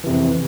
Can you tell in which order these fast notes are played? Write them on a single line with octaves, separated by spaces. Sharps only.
E3 C3 F2